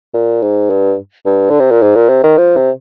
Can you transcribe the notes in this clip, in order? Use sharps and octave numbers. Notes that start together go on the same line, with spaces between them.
A#2
G#2
G2
G2
D3
C3
A#2
G#2
A#2
C3
D#3
F3
C3